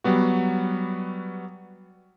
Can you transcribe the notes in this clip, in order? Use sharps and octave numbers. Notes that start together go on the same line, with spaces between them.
F#3 G3 B3 F#4